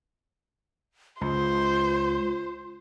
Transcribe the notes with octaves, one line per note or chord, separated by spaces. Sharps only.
C#2 F4 C5